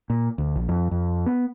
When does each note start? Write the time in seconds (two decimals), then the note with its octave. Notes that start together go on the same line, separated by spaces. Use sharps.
0.10 A#2
0.38 D2
0.56 A#1
0.69 F2
0.91 F2
1.26 B3